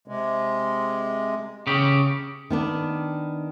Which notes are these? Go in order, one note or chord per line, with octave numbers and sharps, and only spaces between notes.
C3 G#3
C#3 G4
D#3 B3 D4